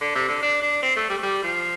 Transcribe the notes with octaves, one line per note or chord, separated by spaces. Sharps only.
D3
C3
D3
D4
D4
C4
A3
G3
A3
G3
F3